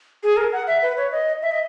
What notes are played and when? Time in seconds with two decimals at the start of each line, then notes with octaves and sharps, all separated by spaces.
0.23 G#4
0.37 A#4
0.52 F#5
0.67 E5
0.82 B4
0.97 C#5
1.12 D#5
1.42 E5
1.51 D#5